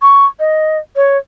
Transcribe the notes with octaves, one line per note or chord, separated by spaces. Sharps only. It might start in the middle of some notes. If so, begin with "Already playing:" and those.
C#6
D#5
C#5